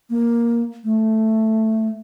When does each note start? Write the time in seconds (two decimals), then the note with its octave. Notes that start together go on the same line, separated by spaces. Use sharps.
0.10 A#3
0.84 A3